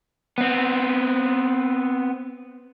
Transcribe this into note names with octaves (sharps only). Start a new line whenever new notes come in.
B3 C4